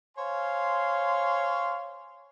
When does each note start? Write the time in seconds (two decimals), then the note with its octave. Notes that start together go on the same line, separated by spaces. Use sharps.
0.18 C5 C#5 F5 G#5 C6